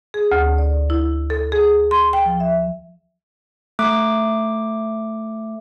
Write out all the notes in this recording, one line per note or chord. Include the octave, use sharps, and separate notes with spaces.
G#4
D2
D5
E4
A4
G#4
C6
G5
F3
E5
A3 D6